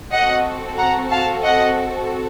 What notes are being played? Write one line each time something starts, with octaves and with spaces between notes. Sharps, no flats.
C4 F#4 A4 D#5 F#5
F#5 A#5
F5 A5
D#5 F#5